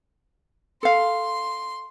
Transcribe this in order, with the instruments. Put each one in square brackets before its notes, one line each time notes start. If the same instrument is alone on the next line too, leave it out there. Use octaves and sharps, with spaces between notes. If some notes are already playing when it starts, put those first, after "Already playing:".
[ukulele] A4 F5 [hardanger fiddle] C6